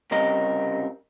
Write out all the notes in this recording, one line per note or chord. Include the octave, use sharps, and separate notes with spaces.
C2 C#3 G3 C4 A#4 D#5